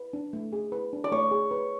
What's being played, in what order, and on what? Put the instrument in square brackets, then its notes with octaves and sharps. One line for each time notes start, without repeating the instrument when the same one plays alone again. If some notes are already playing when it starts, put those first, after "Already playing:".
Already playing: [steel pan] B4
D4
A3
G#4
B4
D4
[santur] D5
[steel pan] A3 [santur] C#5
[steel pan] G#4
B4